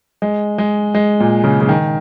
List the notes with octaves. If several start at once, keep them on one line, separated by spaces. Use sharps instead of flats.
G#3
G#3
G#3
A#2
C#3
C#3
D#3